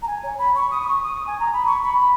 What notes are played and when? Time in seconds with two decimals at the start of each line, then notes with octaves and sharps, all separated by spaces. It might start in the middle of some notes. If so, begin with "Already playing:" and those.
0.02 A#5
0.07 G#5
0.23 C#5
0.38 B5
0.55 C#6
0.71 D#6
0.82 D#6
0.87 C#6
1.03 D#6
1.26 G#5
1.39 A#5
1.52 B5
1.66 C#6
1.82 B5
1.98 B5